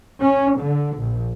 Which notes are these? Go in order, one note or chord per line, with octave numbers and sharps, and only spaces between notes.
C#4
D3
A#1